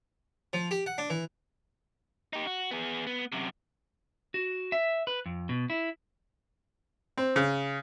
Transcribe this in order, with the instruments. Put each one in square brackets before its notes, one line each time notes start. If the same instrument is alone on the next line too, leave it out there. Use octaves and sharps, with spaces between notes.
[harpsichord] F3
G4
F#5
D4
E3
[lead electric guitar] D#4 G4
F#4
B3 G#4
B3
F#2 C3
[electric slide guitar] F#4
E5
B4
F2
B2
E4
[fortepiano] C4
C#3